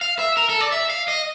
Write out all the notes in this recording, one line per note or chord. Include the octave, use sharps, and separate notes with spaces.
F5
E5
A#4
A4
D5
E5
F5
D#5